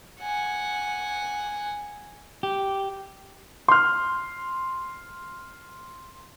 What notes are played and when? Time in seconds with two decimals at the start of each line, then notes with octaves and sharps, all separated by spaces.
0.21 F#5 G#5
2.43 G4
3.68 C6 F6